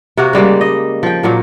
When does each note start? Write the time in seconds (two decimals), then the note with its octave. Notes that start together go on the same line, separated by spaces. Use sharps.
0.17 C3 A#3 F#4
0.33 C#3 G3 G#3 A#3
0.61 D#5
1.03 F3 G5
1.23 A#2 F#3 A#3